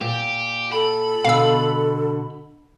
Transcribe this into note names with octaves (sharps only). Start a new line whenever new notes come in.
A#2 G4
A4 B5
B2 D3 F5 E6